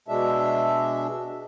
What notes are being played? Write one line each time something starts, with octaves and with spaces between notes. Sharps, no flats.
B2 G#3 D4 E5